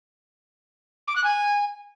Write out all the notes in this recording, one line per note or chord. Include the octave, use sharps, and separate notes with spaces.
D6
F#6
G#5